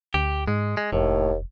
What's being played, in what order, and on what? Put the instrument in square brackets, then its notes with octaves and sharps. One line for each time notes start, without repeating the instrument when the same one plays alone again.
[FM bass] D2 [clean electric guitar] G4
[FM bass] G#2 [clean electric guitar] G#3
[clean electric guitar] G#3
[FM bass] F1 [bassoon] D#2 [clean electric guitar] A2